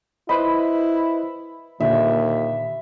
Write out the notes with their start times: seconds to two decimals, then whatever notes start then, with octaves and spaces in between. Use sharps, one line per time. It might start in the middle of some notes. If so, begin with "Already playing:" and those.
0.29 E4 B4 C5 D#5 B5
1.80 D#2 A#2 D3 E5